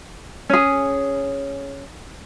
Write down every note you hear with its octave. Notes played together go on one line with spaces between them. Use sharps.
C#4 G#4